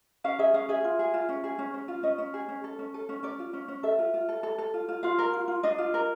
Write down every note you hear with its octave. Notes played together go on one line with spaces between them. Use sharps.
C#4 F5
G#4 E5
C#4 F5
G#4 E5
F4
G#4
F4
C#4
G#4
C#4
C#4
F4
C#4 D#5
C#4
G#4
C#4
A4
C#4
A4
C#4
C#4 D5
F4
C#4
C#4
A4 E5
F4
F4
A4
A4
A4
F4
F4
F4 F5
A#4
F4
F4
D4 D#5
F4
A#4